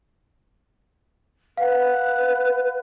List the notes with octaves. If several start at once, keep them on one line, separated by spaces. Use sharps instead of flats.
B4 F5 F#5